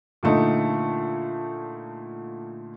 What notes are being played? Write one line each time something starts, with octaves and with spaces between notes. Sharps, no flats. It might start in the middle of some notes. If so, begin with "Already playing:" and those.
A#2 D3 A3 D#4